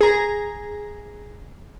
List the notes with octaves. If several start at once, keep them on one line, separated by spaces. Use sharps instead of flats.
G#4 A#5